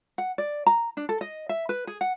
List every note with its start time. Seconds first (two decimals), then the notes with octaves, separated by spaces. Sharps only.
0.18 F#5
0.38 D5
0.67 A#5
0.97 D4
1.09 A4
1.21 D#5
1.49 E5
1.69 B4
1.87 G#4
2.01 F#5